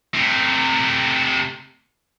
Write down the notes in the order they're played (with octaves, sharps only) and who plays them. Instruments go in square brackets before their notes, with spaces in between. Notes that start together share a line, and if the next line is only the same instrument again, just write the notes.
[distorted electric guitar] C3 A3